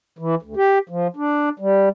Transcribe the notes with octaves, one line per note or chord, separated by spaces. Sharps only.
E3
D2
G4
F3
D4
G3